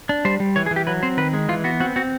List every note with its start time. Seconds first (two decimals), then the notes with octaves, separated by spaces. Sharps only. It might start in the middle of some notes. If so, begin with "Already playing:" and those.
0.09 D4
0.25 G3 C5
0.40 G3
0.56 E3 C#5
0.66 G#4
0.71 E3
0.76 G4
0.87 F#3 B4
1.03 C4 C5
1.17 D#3 B4
1.33 G#3
1.49 E3 F4
1.64 B3 F#4
1.80 C4 F#4
1.96 C4 F#4